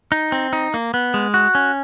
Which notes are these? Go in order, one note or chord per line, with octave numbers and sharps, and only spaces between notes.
D#4
C4
D#4
A#3
B3
G#3
F#4
C#4